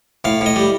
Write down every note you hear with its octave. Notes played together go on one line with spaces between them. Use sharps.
A2 F5
A2 D#5
G3